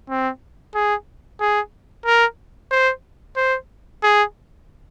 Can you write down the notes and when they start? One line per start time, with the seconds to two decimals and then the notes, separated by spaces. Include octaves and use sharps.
0.09 C4
0.75 G#4
1.40 G#4
2.06 A#4
2.71 C5
3.36 C5
4.03 G#4